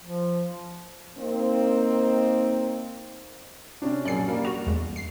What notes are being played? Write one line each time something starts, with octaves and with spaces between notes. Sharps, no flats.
F3
A#3 C4 D#4
C3 C#4 D4
A#1 F#2 D5 C7
G3 A#3
F#4 F7
E2 G#3
C7